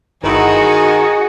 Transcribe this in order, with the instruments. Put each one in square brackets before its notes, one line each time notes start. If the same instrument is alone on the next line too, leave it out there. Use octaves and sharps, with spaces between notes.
[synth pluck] G1 D#4 E4 [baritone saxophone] D#3 [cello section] F#4 D#5 [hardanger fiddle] G#4